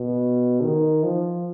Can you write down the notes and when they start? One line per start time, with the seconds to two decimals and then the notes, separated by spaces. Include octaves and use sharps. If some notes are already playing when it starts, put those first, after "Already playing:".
Already playing: B2
0.61 D#3
1.03 F3